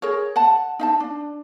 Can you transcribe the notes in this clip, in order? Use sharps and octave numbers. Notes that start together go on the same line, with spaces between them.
G#4 A#4 C#5
F#5 A5
D#4 F5 A5
D4